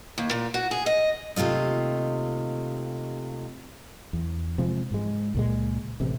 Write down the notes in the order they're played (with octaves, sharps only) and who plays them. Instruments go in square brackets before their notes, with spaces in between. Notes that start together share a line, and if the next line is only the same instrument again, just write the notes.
[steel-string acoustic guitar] D#2
A#2
F#4
G#4
D#5
D#2 C3 A3 F4 D#5
[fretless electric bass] E2
C3 F3 G#3
G#2 G#3
C#2 A#2 G#3
A1 C3